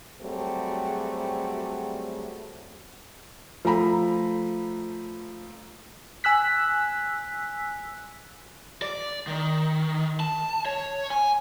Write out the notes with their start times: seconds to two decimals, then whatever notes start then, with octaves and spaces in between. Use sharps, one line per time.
0.22 F#3 G3 A3 C4 F#4 G#4
3.65 F3 A3 A#5 B5
6.24 G#5 E6 F#6 B6
8.82 D5
9.27 D#3
10.20 A5
10.66 C#5
11.10 G#5